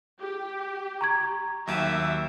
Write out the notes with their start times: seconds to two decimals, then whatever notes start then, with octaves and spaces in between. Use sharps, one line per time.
0.20 G4
1.01 A#5 C#6 G#6
1.68 D#2 F#3 E5